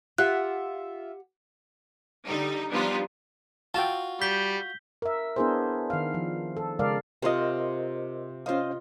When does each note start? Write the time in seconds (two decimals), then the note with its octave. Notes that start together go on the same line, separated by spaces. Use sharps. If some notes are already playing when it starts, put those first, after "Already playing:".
0.18 F4 G4 E5 F#5 F#6
2.26 D3 G3 D#4
2.70 F3 G3 B3 D4 D#4 F4
3.74 F4 F#4 G5 A5
4.21 G3 G6 B6 G7
5.02 A#4 E5
5.36 B3 D4 E4 G#4 A#4 C5
5.90 D#3 F5
6.14 F3
6.57 A4
6.79 C#3 G#3 A#4 D5 F5
7.22 C3 F4 A#4 C5 D#5
8.46 C#4 F4 C5 D#5 F5